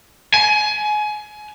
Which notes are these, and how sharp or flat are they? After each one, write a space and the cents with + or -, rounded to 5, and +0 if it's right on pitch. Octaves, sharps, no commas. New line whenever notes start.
G#5 +25